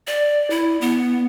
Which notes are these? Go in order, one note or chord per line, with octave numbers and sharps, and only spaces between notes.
D5
E4
B3